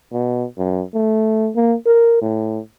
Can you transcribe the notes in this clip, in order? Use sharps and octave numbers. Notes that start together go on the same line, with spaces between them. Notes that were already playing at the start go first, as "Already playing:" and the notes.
B2
F#2
A3
A#3
A#4
A2